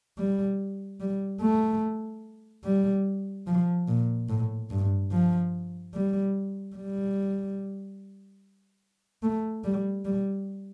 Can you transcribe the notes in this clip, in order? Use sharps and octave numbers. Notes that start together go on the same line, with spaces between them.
G3
G3
A3
G3
F3
A#2
A2
G2
F3
G3
G3
A3
G3
G3